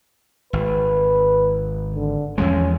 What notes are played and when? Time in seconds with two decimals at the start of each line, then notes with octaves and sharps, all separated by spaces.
0.53 G#1 B4
1.95 D3
2.38 E2 F3 G#3 C#4